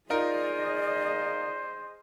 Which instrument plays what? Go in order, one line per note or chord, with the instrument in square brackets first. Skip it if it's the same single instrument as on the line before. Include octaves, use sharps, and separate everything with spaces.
[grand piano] D#4 F4 A#4 [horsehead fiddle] G#4 D#5 [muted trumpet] C5 [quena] D5